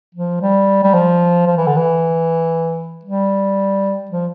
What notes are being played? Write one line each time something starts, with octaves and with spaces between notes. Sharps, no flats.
F3
G3
G3
F3
F3
E3
D3
E3
G3
F3